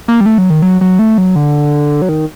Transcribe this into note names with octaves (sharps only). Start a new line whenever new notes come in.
A#3
G3
A3
F#3
D#3
F#3
F#3
A3
F#3
D3
F#3
D#3